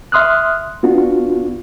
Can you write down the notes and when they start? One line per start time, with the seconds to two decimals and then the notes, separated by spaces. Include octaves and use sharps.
0.12 E5 C6 D#6 F6 F#6
0.83 B3 D4 F4 F#4